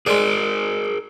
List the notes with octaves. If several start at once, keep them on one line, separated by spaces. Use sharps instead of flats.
G#3 G#4 A#4 D5